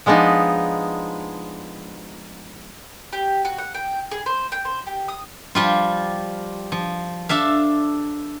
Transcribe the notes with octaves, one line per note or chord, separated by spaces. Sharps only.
F3 G#3 B3 D4 D#4
G4
F#4
F#5
G5
G#4
C5
G5
C5
G4
D#6
F3 G3 F4
F3
D4 A4 E5 F5